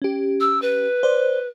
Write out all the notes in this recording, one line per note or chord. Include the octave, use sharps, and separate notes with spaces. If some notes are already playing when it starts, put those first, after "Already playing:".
C#4 G4
E6
B4
C5 D5